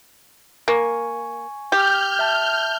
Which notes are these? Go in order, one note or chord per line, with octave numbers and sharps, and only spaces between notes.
A#3 G#5 C#6
G4 F6 G6
E5 A5